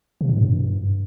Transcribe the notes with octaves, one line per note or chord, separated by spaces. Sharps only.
C3
A2
G2